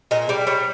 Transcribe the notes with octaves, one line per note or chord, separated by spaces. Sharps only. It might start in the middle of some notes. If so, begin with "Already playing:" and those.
A#2 D#5
G3 D5
G3 C#5